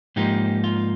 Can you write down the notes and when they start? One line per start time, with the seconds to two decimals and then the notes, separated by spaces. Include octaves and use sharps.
0.16 G#2 F3 A#3 D#4 G4
0.64 F4